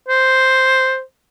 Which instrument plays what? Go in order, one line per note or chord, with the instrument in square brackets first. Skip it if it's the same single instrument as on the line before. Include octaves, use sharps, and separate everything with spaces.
[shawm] C5